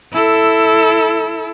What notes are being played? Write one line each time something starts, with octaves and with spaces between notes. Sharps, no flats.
E4 A4